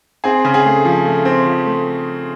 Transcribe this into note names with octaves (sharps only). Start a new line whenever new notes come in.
C4 G#4
C#3
G#4
A3
F3
A3
C4
F3
A3